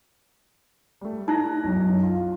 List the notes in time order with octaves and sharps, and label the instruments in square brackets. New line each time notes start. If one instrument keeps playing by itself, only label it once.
[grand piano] G3 A3
[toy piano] D#4 E4 [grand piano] A#5 F#6 A#6
[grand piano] B1 F#2
F4